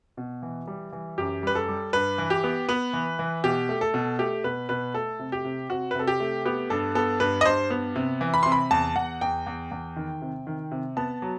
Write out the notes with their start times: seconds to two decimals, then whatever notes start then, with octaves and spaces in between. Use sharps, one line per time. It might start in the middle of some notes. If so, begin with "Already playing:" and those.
0.17 B2
0.42 E3
0.67 G3
0.92 E3
1.18 F#2 G4
1.43 G3 B4
1.55 A4
1.68 G3
1.93 G2 B4
2.18 E3
2.30 G4
2.44 B3
2.69 B3 B4
2.93 E3
3.19 E3
3.44 B2 G4
3.69 A3
3.81 A4
3.94 B2
4.19 A3 G4
4.44 B2 B4
4.69 B2 B4
4.94 A3 A4
5.19 C3
5.32 G4
5.45 C3
5.69 C3 F#4
5.91 B4
5.95 C3 A4
6.07 G4
6.20 A3
6.45 B3 G4
6.70 G2 A4
6.95 B3 A4
7.20 G2 B4
7.41 D#5
7.45 G2 C5
7.70 B3
7.96 C3
8.21 E3
8.34 B5
8.43 C3 C6
8.52 B5
8.71 E2 A5
8.96 E2 F#5
9.21 E2 G5
9.46 E2
9.71 E2
9.96 D#3
10.22 C3
10.47 D#3
10.72 C3
10.97 B3 A5
11.22 F#3